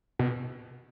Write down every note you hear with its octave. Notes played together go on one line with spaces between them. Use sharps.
B2